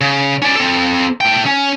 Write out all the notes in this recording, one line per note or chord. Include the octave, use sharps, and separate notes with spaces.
C#3
C#4 D5
C4 A4
A2 G5
C#4